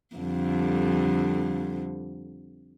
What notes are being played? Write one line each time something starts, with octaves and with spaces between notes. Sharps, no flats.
F2 D3 G3